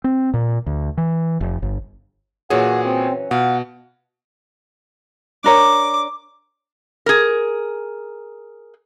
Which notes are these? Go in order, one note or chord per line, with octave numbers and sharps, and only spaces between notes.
C4
A#2
D2
E3
F1
G1
A#2 E3 F#3 C#4 F#4 G#4 F#5
C4
B2 F4 F#5
D4 A#4 C#5 D6
G#4 A#4